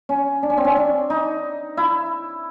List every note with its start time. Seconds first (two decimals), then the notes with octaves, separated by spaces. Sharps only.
0.09 C#4
0.43 D4
0.50 C#4
0.57 C4
0.65 C#4
0.77 D4
1.10 D#4
1.77 E4